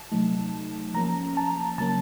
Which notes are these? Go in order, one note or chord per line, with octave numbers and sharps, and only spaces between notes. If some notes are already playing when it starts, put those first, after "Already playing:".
Already playing: A5
C3 F#3 A3 D#4
F3 A#3 C#4 A#5
A5
C#3 F#3 A#3 C#4 A5